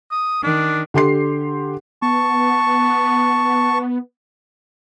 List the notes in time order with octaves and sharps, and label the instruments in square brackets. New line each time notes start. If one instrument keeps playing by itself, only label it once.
[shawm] D#6
[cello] D#3 [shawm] D4
[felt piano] D3 G4 C6 C7
[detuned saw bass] B3 [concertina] A5 C#6